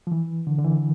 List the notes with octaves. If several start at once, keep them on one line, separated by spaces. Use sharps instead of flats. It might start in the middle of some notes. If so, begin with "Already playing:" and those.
F3
E3
D3
D3
E3